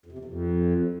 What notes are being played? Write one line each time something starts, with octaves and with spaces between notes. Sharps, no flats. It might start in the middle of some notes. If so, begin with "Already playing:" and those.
F2
C3
E2
F2